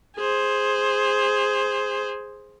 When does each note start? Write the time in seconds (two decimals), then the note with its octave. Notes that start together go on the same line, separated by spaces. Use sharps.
0.17 G#4 C5